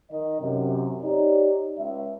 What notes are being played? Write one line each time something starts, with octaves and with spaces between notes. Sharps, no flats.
D#3 D#5
F#2 C3
D#4 G4 C#5 D5
C#2 E5